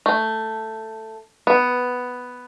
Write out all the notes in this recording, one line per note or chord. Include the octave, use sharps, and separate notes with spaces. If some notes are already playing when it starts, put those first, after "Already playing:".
A3
B3